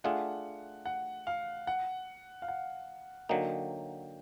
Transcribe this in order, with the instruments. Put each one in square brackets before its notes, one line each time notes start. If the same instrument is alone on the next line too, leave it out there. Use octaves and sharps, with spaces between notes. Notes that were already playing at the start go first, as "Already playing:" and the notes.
[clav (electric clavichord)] A3 D4 F4 G#4 [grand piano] F#5
[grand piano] F#5
F5
F#5
F5
F#5
[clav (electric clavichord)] D3 F#3 A#3 D#4 [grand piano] G5